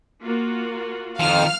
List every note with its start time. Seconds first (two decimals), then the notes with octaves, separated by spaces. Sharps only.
0.24 A#3 F4 F#4
1.20 F2 D#3 F3 F5 F6